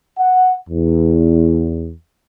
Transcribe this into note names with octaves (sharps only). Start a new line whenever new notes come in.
F#5
E2